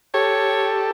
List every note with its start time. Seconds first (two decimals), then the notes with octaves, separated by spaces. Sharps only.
0.14 G4 A4 C#5